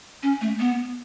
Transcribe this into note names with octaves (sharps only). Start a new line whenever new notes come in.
C#4
A3
B3